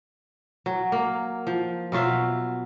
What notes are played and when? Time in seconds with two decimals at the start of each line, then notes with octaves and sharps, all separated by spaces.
0.66 F#3
0.92 A#3
1.47 F3
1.92 B2 F#3 F4 E5